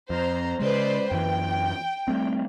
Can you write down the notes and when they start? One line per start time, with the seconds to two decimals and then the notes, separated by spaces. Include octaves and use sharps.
0.10 F2 C5 A#5
0.60 C#3 G#3 B4 C5 D5
1.11 F#2 E3 G5
2.08 G3 A3 C4